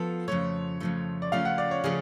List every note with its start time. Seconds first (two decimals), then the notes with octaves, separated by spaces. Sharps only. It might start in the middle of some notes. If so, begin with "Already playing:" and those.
Already playing: F3 B3 F4 A4
0.28 F2 C#3 F3 A3 C#5
0.80 F2 C#3 F3 A3
1.22 D5
1.32 C#3 F3 A3 C#4 F4 F5
1.45 F#5
1.58 D5
1.71 C#5
1.84 C#3 F3 A3 C#4 G#4